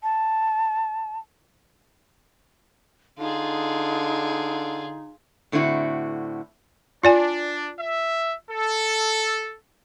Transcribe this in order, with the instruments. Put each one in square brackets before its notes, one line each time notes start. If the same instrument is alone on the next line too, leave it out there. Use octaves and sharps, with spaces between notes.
[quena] A5
[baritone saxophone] D3 [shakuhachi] D#4 [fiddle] F4 G#4
[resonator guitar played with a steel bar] A2 D3 C4 E4 F#4
[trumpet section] D4 [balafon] F4 D5 G#5
[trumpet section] E5
A4